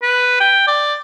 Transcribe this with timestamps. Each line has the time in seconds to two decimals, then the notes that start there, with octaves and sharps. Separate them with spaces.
0.02 B4
0.40 G5
0.67 D5